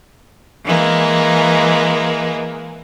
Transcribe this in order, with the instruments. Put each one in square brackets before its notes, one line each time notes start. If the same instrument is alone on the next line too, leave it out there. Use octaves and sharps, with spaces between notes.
[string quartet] E3 G#3 A#3